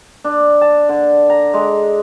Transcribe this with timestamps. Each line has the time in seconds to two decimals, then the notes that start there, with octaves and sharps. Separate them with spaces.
0.24 D4
0.61 A5
0.89 D3
1.30 A#5
1.54 G#3